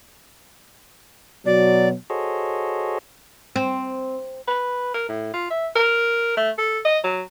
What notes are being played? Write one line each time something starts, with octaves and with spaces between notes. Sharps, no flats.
B2 F#3 D5
F#4 G#4 A4 C5 C#5 D#5
C4
B4
A#4
A2
F4
E5
A#4
A3
A4
D#5
F#3